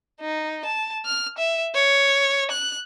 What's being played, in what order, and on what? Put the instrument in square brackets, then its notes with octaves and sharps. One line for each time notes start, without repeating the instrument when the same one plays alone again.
[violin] D#4
A5
F6
E5
C#5
F#6